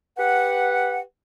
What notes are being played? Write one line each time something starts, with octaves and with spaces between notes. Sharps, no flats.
G4 B4 F#5